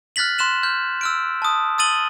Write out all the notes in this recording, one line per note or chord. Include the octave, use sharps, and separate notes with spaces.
F6 F#6 A6 B6 F#7
C6 F#6 E7 F#7
F6 G6
E6 F6 D7
A5 D#6
D#6 E6 A6 D#7 F#7 G7